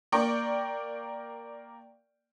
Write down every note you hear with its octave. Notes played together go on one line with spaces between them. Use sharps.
A#3 A#4 D5 G5 C#6